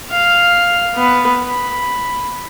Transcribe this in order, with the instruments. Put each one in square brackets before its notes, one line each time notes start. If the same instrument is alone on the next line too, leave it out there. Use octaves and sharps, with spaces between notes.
[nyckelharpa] F5
B3 B4
B5